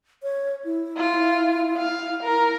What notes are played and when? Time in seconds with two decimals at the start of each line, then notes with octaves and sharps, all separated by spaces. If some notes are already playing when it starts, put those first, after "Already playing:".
0.23 C#5
0.65 E4
0.97 F4
1.77 F5
2.23 A#4